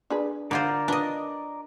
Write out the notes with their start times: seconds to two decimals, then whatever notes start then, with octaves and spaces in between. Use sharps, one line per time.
0.10 D4 G#4 B4
0.51 D3 F4 A#4 C5 D5 A#5
0.88 D4 F4 B4 D#5